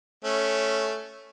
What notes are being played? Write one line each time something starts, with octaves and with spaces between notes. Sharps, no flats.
A3 C#4